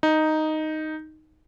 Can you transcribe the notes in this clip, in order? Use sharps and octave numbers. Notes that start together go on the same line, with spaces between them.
D#4